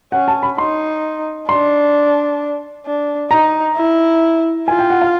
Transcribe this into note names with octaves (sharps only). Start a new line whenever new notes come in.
C#4 F#5
A5
B5
D#4 C6
D4 C6
D4
D#4 A#5
E4
F4 G#5
G5
F#5
F5